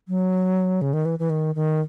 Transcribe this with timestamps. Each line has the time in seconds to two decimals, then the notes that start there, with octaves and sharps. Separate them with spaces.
0.08 F#3
0.81 C#3
0.93 D#3
1.05 E3
1.19 E3
1.30 D#3
1.55 D#3